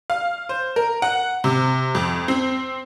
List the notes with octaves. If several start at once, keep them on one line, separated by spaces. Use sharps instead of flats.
F5
C5
A#4
F#5
C3
F2
C4